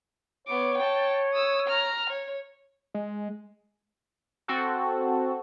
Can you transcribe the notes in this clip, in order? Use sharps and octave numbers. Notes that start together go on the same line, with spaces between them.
B3 C#5 D6
G5 A5
D#6 E6
A#5 F6
C#5
G#3
C4 F#4 A4